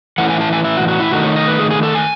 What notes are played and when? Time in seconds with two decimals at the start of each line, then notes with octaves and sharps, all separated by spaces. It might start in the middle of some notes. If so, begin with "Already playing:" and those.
0.18 A2 E3 A3 C#4 E4 F#5
0.30 G#5
0.41 A5
0.53 G#5
0.64 E5
0.77 F#4
0.88 F#4
1.00 E4
1.11 D#3 A3 D#4 F#4
1.24 C#5
1.36 D#5
1.48 B4
1.59 G#4
1.71 G#4
1.83 A4
1.95 G#5